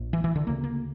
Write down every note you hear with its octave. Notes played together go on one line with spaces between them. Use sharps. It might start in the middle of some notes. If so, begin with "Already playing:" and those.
Already playing: A#1 A#2
E3
E3
D3
D2 C#3 A#3
A#3